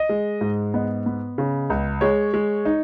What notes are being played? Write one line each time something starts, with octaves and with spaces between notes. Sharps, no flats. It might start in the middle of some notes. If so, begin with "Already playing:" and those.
Already playing: D#5
G#3
G#2
B3 D#5
B3
C#3
C#2
G#3 C#5
G#3
D#4